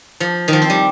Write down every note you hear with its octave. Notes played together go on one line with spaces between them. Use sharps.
F3
D#3
F3
C4
G3